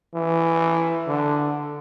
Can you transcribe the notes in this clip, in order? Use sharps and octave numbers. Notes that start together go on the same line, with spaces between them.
E3
D3